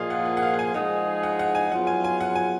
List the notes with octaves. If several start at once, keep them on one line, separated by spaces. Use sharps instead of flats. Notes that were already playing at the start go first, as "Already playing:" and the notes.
Already playing: A#2 F3 A#3 F4 G#4 D#5 F5
F#5
F#5
F#5
F5
F#5
G#5
F3 G#3 D#4 G#4 F#5
F#5
F#5
G#5
F#3 B3 F4 G#4 F#5
G#5
G#5
F#5
G#5